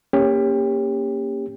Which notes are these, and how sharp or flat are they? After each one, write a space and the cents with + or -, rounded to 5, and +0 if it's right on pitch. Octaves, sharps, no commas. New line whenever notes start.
A#3 +0 C#4 +0 G4 +25